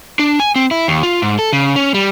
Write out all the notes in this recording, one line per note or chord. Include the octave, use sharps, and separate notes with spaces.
D4
G#5
C4
E4
D#2
F4
G#2
A4
C#3
C#4
G3